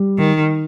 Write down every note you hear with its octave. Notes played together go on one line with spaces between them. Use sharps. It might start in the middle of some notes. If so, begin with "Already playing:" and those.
Already playing: G3
D#3